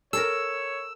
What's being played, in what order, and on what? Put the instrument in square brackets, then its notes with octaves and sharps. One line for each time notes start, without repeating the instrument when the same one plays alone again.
[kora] A4 A#4 [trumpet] C#5 [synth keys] E6